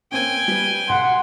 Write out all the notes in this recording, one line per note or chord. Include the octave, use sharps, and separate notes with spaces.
A#3 C4 C#4 G5 G#5
G3 B3
B1 F#5 C6